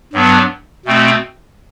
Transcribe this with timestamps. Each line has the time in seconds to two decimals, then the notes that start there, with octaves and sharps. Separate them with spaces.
0.13 G2 F#3 B3 D4
0.85 B2 A3 C4